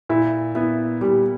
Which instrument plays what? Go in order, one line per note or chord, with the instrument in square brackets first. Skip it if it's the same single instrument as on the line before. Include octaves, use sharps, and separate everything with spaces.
[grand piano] A#2 [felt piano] E4
[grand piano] B3 [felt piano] E4
[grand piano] A#2 [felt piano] G3